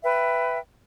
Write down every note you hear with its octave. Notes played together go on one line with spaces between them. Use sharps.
B4 E5 G5